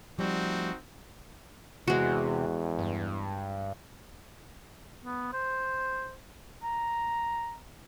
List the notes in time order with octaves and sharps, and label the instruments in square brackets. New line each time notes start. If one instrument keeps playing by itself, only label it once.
[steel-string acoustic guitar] F3 G3 A3 [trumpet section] C4 D#4 F#4
[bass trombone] E2 [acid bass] C3 [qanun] G#3 F#4
[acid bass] G2
[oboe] B3
C5
A#5